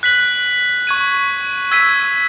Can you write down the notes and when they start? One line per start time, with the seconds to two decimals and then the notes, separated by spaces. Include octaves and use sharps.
0.03 F#6 B6 F#7
0.87 C#6 G#6 D#7
1.71 E6 G#6 B6 D#7